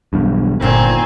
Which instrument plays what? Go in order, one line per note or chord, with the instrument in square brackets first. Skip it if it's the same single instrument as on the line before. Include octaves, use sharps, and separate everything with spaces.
[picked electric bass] B1 E2 G2
[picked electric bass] G1 [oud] E2 A#2 D#3 [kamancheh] C4 G#5